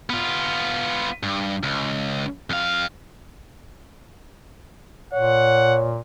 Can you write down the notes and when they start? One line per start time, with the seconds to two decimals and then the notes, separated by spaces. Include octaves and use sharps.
0.10 B3 F4
1.23 G2
1.63 C#2
2.50 F2 F5
5.13 A#2 C#5 F#5